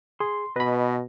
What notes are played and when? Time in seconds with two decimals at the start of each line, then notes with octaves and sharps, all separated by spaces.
0.20 G#4 C6
0.56 B2 B4 D#5 B5